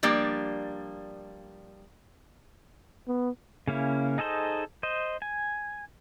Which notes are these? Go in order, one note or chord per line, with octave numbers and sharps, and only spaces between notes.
F3 G3 A#3 D4
B3
C#3 A#3 C#4 E4
D#4 G#4 A4 C5 D#5
C5 D#5
G#5